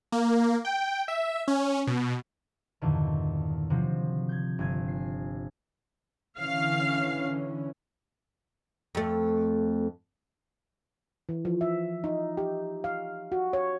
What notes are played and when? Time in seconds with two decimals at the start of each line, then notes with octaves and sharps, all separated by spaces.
0.12 A#3
0.65 G5
1.08 E5
1.48 C#4
1.87 B2
2.82 E2 G2 A#2 D3 D#3
3.70 C3 F3 F#3
4.29 G6 G#6
4.59 G1 G#5 G#6
4.88 C7
6.39 D3 E3 C#4 F5
8.95 F2 A3
11.29 E3
11.45 F3
11.61 E5
12.04 D#4
12.37 G4
12.84 F5
13.32 F#4
13.53 C#5